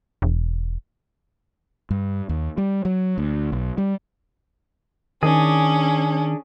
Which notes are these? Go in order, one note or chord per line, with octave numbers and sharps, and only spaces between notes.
E1
G2
D#2
G3
F#3
D2
B1
G3
D#3 C#4 D4 G#4